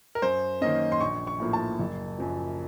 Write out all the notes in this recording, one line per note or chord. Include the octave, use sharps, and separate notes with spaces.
A#4
F#2 C5
D#3 A#3 C#4 D#5
C6
A#1 C#6
C#6
A2 F3 A#3
A5
F#1
F#2 F3